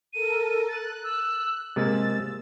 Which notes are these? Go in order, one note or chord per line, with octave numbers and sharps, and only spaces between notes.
A4 A#4 D#7
F#6 A6
E6
C3 G#3 A#3 E6 A6